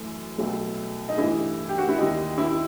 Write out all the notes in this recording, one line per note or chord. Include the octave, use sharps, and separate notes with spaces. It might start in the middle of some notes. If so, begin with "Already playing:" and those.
Already playing: F#2 E3 A3
C2 B2 F#3 A3
D#4
G2 E3 A3 E4
G4
F#4
E4
D#2 D#3 G3 D#4
E4